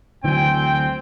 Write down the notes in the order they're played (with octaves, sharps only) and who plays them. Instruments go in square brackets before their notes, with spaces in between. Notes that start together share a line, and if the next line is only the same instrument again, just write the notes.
[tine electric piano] D2 G#5 [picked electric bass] D3 E3 F#3 [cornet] C4 [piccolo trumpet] G5